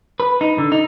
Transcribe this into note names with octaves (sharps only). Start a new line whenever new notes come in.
B4
D#4
D3
D#4